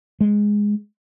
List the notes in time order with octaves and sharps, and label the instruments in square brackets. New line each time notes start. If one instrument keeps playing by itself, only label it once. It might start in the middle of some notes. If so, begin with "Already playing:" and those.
[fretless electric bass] G#3